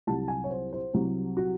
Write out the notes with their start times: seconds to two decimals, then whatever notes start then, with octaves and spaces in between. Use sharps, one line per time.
0.07 C2 C3 F#3 A5
0.28 G#5
0.44 C#5
0.51 C5
0.73 C5
0.94 C2 C3 F#3
1.37 F#4